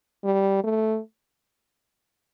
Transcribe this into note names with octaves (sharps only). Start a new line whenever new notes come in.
G3
A3